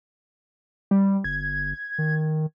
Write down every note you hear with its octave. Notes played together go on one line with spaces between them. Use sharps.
G3
G1 G#6
D#3